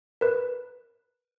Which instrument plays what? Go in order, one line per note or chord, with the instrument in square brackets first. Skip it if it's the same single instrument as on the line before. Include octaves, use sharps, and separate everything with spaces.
[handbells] A#4 B4